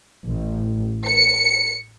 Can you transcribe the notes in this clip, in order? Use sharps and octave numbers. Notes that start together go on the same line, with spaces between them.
A1
C#7